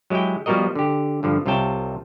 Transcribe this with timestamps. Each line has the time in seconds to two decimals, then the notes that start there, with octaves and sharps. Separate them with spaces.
0.10 F#3 G#3 E4 G4 G5
0.46 F3 G3 B3 F#4 A#4 D#5
0.75 D3 G4
1.23 G2 D3 F3
1.46 C2 C3 F4 C#5 G5 A5